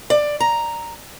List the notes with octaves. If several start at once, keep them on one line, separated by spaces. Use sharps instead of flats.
D5
A#5